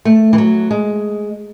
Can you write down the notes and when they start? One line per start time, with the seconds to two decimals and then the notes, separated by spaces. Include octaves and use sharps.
0.05 A3
0.33 E3
0.38 F#3
0.71 G#3